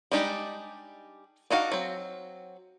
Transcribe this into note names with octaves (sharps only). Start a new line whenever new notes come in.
G3 G#3 D4 D#4 G4
D4 D#4 F#4 F5
F#3 C4